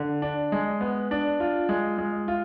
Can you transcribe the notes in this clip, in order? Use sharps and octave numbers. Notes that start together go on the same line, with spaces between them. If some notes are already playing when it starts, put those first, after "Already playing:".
Already playing: D3
D4
G#3
B3
D4
F4
G#3
G#3
F4